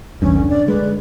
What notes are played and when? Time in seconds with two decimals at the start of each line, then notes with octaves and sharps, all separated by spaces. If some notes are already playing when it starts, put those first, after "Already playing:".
0.22 A#1 E2 G2 C#4
0.36 D3
0.49 D5
0.68 G#3 B4